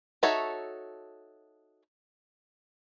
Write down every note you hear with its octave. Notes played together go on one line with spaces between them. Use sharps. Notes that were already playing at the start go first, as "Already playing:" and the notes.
D#4 F#4 A4 C#5 E5